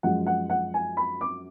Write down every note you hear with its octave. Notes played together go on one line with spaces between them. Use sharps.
F#2 F3 G#3 F#5
F#5
F#5
G#5
B5
D6